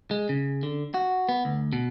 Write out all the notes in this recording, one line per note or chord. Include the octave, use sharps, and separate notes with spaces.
G#3
C#3
D3
F#4
B3
D2
B2